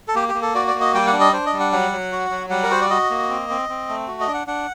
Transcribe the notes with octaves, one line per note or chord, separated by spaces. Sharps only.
A4
A#3 G4
G4
A#3
A4
F#4 D5
D5
A#3
D#5
G3 G5
F#5
D4
D#5
D4 C5
D#5
G3
F#5
F#3 F#5
F#3
F#4
F#3
G3 F#5
A#4
F#4 C5
D5
F#4 D#5
A#3
C4
C4
C4
A3
F#4
D#5
D4
F#5
D4 F#5